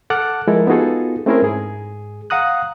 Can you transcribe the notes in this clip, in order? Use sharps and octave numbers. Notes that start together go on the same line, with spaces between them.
A4 F#5 A5 D6 F6 F#6
F3 G#3 E4 A4 A#4
B3 D#4 F4 F#4 G#4 A4
A3 C4 C#4 E4 G#4 A#4
G#2 G#4
F5 F#5 A#5 D#6 F#6